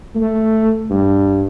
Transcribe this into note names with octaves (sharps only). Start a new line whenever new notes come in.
A3
G2